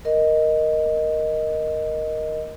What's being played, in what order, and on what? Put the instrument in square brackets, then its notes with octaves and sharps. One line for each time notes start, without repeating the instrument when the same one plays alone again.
[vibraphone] A#4 D#5